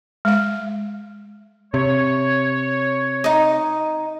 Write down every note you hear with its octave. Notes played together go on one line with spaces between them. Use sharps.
G#3 F5
C3 C#5
D#4 D#5